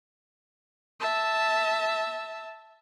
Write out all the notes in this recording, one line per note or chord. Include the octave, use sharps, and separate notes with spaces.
E5 A5